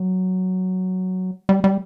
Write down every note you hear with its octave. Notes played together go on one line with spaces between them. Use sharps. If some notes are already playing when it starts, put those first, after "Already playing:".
Already playing: F#3
G3
G3